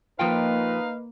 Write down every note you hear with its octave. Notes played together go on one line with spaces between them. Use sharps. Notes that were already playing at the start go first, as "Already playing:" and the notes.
F3 A#3 D#4 F4 B4 F5 G5